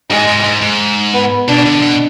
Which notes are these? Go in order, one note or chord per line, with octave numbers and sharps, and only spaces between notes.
G#2 G#3
G#2
G#2
G#2
B3
B2 D4
D3
B2